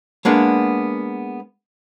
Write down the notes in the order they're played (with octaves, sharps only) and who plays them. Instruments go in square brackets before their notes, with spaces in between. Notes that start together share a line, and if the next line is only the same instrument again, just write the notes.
[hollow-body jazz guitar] G#3 A#3 B3 D4